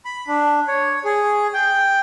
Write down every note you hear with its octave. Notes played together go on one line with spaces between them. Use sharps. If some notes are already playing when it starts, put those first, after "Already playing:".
B5
D4
C#5
G#4
G5